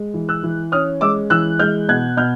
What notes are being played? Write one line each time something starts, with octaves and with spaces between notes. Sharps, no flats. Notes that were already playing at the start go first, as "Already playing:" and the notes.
Already playing: G#3
E3
E6 F#6
E3
C#4 D#6 F6
G#3 D6 E6
E3 E6 F#6
G#3 F6 G6
B2 F#6 G#6
B2 F6 G6